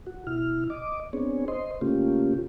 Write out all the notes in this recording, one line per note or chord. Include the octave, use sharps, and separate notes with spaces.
F#4
B2 E4 F6
D#5 D6
B3 C4 D4 G#4 C#5
C5 D#5 C6
C#3 A3 A#3 C#4 F4 G4